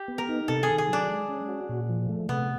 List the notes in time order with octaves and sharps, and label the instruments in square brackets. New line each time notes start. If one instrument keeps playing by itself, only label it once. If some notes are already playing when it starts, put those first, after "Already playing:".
Already playing: [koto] G4
[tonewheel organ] B3
[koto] A#4
[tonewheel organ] D#4
[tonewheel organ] C3 [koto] A4
[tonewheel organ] D#3 [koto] G#4
[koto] G#4
[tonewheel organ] F#3 [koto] D4
[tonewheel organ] G#3
C#4
F#4
A#2
F3
A3
[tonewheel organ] C3 [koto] B3